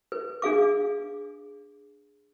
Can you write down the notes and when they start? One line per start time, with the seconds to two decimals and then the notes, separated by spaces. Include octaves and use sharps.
0.12 B4
0.42 D4 G#4 F5 D6